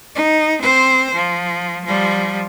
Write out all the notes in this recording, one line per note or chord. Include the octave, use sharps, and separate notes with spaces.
D#4
C4 C5
F3
F3 G3